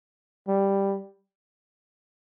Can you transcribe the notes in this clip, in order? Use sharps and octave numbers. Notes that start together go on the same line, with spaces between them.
G3